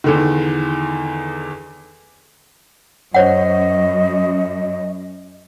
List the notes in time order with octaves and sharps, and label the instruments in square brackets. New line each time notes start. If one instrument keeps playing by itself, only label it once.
[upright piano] E2 D3 D#3
[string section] F#2 [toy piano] C5 C#5 F#5 [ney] D#5